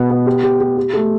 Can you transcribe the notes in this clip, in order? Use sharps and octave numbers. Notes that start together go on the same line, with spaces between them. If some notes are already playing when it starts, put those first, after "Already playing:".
Already playing: B2 B3
B3
G4
G4
G4
G4
A3